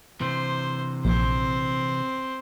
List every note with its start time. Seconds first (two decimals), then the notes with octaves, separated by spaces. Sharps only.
0.21 C3 E3 C5
1.05 A#1 C4 C5